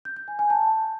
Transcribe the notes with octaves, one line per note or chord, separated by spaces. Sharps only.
G6
G6
G#5
G#5
A5